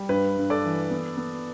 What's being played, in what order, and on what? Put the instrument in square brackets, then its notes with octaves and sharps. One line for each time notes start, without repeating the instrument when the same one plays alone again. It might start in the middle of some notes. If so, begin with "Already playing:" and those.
Already playing: [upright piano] G3
G2 B4
G2
A4 D5
E3
B3
B3